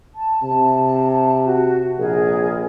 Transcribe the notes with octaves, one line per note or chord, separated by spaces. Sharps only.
A5
C3
F#4
A#1 G#4 A#4